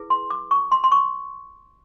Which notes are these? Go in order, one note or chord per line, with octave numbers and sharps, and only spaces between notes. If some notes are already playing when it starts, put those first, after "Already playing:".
Already playing: E4 G#4 B4
C6
D6
C#6
C6
C6
C#6